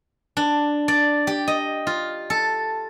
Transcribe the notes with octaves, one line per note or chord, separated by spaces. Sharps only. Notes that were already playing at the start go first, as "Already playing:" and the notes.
D4
D5
G4
D#5
F4
A4